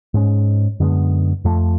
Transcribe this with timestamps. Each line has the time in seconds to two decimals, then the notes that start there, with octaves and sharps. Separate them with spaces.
0.14 G#2 G#3 C#4
0.80 F#2 D3 G#3 B3
1.44 F2 F3 A3